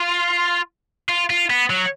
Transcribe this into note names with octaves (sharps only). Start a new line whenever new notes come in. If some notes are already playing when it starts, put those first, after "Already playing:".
Already playing: F4
F4
F4
B3
F#3